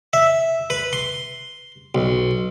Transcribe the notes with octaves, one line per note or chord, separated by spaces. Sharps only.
E5
B4
C6
B1